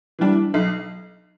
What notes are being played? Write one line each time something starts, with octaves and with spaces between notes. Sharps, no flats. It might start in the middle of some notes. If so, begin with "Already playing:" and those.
E3 G3 D4
B1